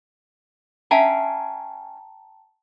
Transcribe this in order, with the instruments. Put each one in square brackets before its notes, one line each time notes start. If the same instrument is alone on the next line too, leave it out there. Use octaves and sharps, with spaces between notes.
[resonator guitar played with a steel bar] C#4 E5 [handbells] G5 A5 A#5